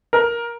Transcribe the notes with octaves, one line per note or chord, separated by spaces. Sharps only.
A#4